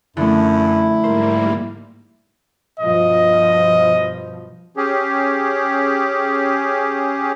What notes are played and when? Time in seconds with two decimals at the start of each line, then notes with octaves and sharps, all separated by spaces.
0.17 F#2 D3 F3 A3 E4
1.04 G#2 G3 A#3 A#4 C5
2.80 G2 B2 F3 D#5
4.77 C#4 G4 G#4